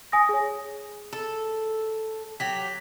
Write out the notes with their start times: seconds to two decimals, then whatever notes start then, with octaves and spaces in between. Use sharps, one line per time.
0.12 G#5 D#6 A#6
0.29 G#4 C#5
1.13 A4
2.40 F#3 G4 B6